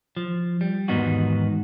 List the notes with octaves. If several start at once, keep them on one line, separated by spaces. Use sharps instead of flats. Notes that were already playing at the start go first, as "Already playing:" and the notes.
F3
G3
E2 G#2 D#3 B3 D#4 F#4